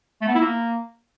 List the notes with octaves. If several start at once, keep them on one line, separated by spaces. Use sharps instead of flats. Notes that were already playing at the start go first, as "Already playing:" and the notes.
A3
B3
E4
A#3